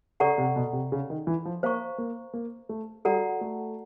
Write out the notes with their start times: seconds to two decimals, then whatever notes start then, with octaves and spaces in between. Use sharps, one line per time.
0.20 C#3 A4 D5 F#5 A#5 C#6
0.38 C3
0.56 B2
0.73 C3
0.92 C#3
1.10 D#3
1.27 E3
1.45 F3
1.63 A#3 C5 F5 A#5 C#6
1.98 A#3
2.33 A#3
2.69 A3
3.05 G3 F#4 A4 D5 F#5 A#5
3.41 A3